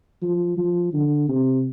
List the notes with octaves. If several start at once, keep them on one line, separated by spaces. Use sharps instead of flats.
F3
F3
D3
C3